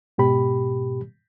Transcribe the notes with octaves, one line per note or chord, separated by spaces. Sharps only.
G#2 B2 G4 B5